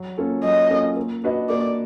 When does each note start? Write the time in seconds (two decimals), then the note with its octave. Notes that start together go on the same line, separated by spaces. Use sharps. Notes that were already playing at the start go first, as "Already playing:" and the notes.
Already playing: F#3
0.17 A#3 C#4 F4 A4
0.44 F#3 D#5
0.70 A#3 C#4 F4 A4
0.96 A#3
1.24 D4 F#4 B4 D#5
1.49 A#3 D5